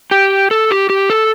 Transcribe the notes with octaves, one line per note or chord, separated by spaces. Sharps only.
G4
A4
G4
G4
A4